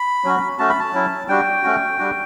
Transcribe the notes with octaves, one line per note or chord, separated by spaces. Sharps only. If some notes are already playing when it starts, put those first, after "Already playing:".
Already playing: B5
F#3 C#4 F#4
A3 C#4 F#4 A5
B5
A5
F#3 C#4 E4
G3 D4 F#4 G5
A3 C#4 F#4
G3 D4 F#4